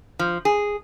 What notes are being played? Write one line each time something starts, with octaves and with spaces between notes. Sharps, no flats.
F3
G#4